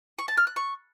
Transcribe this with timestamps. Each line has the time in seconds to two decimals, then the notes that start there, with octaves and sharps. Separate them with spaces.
0.19 C#6
0.28 A5
0.37 F6
0.47 F#6
0.56 C#6